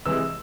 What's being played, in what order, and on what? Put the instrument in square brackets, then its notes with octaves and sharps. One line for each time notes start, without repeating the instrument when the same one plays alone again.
[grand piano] C3 E3 G#3 E6